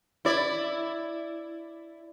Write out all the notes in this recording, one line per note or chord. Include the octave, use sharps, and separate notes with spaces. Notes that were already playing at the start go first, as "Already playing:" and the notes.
E4 D5